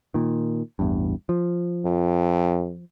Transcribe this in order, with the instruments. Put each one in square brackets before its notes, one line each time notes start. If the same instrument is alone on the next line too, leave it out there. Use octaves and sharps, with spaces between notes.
[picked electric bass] A#2 D#3
A1 E2 G2
F3
[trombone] F2